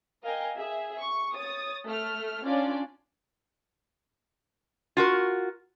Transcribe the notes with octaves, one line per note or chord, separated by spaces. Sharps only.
A#4 D#5 F5 G5 G#5
G#4 E5
C#6
C#5 D#6 A6
A3 F6
C#4 D4 F4 D5
F4 F#4 A#4